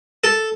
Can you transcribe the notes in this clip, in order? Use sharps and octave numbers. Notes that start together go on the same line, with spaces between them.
A4